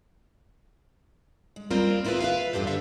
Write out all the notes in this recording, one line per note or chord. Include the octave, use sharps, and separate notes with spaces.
G#3
G3 A#3 C4 F4 A#4
A#3 E4 F4 G#4 B4
B4 E5 F5
E2 G2 D4 G4 A4 C5
D3 A4 E5 F5